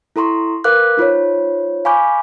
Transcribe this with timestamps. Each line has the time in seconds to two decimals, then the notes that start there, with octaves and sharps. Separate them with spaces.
0.16 E4 A4 A#5 C6 C#6
0.64 A#4 B4 F5 D6 F#6
0.97 D#4 F4 C5 C#5
1.85 F5 G#5 B5 C#6 D6 G6